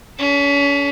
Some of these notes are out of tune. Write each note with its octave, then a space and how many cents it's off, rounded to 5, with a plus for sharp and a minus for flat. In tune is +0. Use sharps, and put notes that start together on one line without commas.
C#4 +35 A4 +0